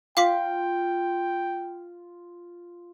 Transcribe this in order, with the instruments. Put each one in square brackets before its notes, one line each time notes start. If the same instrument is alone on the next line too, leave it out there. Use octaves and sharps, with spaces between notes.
[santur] F4 [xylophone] F5 D6 B6 [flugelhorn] G5